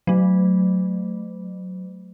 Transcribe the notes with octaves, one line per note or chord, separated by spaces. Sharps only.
F#3 A3